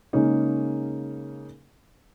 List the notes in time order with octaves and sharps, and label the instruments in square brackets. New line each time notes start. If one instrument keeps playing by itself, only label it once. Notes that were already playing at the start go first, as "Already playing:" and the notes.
[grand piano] C#3 G#3 A#3 C#4 D#4